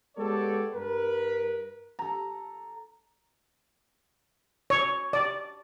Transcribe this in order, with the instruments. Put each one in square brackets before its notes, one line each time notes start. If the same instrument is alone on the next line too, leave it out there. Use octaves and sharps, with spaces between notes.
[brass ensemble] G#3 B3 G4 A4 C#5 D5
G2 A#4 B4
[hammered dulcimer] A4 A#5
[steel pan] C#5
D5